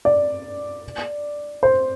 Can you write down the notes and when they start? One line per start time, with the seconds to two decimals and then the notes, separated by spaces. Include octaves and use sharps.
0.05 D5
1.63 C5